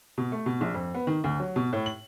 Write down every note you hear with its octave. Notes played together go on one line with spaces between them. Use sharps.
B2
A3
B2
A#1
F2
B3
D#3
D2
F#3
B2
A2
F#7